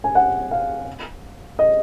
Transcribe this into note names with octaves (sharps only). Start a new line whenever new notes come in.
G#5
F#5
F5
D#5